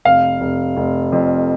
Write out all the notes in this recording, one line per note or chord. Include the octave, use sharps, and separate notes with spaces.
F1 F5
F1
F1
F2